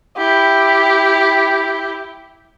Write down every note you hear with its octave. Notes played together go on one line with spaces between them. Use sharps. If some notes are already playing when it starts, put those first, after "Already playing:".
E4 G4